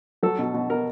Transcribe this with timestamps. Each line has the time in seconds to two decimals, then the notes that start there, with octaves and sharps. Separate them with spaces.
0.23 F#3 A4
0.39 B2
0.54 B2
0.70 B2 A#4